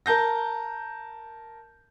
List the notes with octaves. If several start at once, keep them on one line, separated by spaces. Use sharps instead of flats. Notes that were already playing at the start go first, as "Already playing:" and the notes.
A#4 A5 G6 A#6